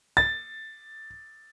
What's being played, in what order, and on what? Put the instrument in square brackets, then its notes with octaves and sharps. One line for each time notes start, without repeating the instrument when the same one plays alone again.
[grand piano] A6